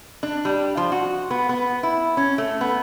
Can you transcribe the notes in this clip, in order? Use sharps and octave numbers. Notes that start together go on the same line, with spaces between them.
D4
G3
F3
F#4
B3
B3
E4
C#4
A3
B3